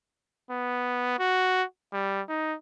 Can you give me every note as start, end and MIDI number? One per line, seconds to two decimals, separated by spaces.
0.51 1.16 59
1.19 1.63 66
1.93 2.22 55
2.29 2.55 63